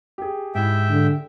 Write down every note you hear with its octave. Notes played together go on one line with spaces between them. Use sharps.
G4 G#4
G#2 E4 E5 G5
D3